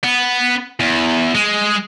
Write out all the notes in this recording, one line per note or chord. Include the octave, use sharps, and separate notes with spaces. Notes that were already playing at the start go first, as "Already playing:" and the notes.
B3
E2
G#3